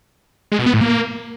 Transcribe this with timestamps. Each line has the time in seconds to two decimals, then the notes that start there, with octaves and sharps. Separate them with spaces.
0.52 G#3
0.59 B2
0.66 B3
0.74 A2
0.81 A#3